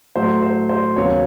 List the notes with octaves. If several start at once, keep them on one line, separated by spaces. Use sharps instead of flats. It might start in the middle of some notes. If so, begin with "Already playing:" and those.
A2 F#3 A3 C5
C5
C5
D#2 C#3 F#3 B3 C#5